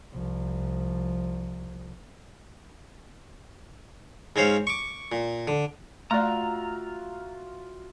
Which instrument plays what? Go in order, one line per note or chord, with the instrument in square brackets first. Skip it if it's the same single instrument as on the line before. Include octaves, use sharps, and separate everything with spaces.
[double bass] C2 F3
[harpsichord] G#2 C4 C#4 C5 C#5 F5
C#6 D6
A#2
D3
[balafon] A3 D5 [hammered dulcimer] F4 F#4 E5 [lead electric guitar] A#5